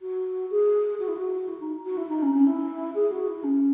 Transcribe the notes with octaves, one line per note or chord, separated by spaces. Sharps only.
F#4
G#4
F#4
E4
F#4
E4
D#4
F#4
E4
D#4
C#4
C#4
E4
G#4
F#4
E4
C#4